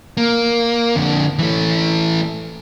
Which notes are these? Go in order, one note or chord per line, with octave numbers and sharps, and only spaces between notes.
A#3
F2 D3
E3 A3